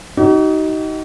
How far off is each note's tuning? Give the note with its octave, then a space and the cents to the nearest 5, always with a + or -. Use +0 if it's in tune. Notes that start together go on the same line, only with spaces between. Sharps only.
D#4 +15 F#4 +45